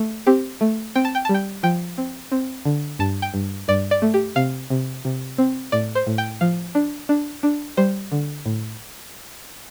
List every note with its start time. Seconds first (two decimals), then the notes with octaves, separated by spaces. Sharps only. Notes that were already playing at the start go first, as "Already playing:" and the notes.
Already playing: A3
0.27 C4 G4
0.61 A3
0.95 C4 G5
1.05 A5
1.15 G5
1.25 G3 A5
1.34 G5
1.63 F3 G5
1.98 C4
2.32 C4
2.65 D3
2.99 G2 A5
3.22 G5
3.34 G2
3.68 G2 D5
3.91 D5
4.02 A3
4.14 G4
4.36 C3 F5
4.70 C3
5.05 C3
5.38 C4
5.72 A2 D5
5.95 C5
6.07 A2
6.18 G5
6.41 F3 F5
6.75 D4
7.09 D4
7.43 D4
7.77 G3 C5
8.12 D3
8.46 A2